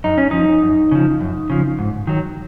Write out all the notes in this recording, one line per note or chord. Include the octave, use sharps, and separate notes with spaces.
F#2 D#4
C#4
F3 D#4
F#2
C#3 F3
F#2
C#3 F3
G#2
D#3 F#3